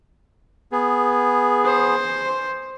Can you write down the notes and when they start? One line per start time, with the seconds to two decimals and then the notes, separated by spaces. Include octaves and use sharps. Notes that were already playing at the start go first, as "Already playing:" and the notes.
0.72 B3 G#4
1.65 C5